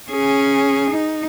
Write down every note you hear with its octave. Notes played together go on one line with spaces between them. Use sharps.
C#4 G#4
D#4